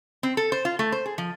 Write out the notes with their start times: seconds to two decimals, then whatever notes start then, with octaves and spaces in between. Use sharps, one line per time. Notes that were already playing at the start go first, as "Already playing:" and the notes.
0.23 C4
0.37 A4
0.52 C5
0.65 F4
0.79 A3
0.92 C5
1.06 G#4
1.18 F3